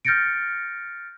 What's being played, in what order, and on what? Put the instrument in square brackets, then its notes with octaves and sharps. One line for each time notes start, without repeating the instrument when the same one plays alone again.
[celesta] F6 G6 A6 A#6 C#7 D7